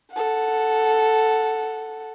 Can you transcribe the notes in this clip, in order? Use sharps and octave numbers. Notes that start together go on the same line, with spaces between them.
A4 F#5